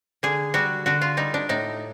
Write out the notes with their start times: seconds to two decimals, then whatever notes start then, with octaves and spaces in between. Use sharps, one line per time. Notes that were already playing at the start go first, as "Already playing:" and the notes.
0.23 D3 G#4
0.54 G3 F#4
0.86 D3 F#4
1.02 F4
1.17 G3 D#4
1.34 D4
1.49 A2 D#4